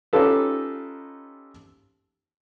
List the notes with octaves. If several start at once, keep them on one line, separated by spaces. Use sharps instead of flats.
C#4 D#4 F4 G4 A4 B4